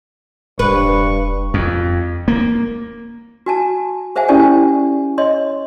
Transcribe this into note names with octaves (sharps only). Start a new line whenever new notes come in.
E1 G2 B4 C#6
F2
A#3
F#4 G#5 A5
G#4 C5 E5 F#5 G#5
C#4 E4 G4 A4 D5 G#5
C#5 D#5 C6